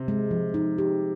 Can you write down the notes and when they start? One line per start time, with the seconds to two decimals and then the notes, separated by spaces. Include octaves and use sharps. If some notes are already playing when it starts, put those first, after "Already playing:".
Already playing: C3
0.08 G#3
0.31 F3
0.54 D#4
0.78 G4